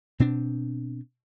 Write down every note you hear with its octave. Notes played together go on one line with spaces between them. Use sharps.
B2 C4 D4